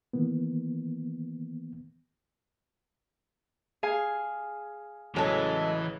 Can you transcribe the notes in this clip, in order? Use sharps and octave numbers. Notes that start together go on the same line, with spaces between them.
D#3 E3 A#3 B3
G#4 F5 G#5
A1 C#3 E3 F#3 G#3 A4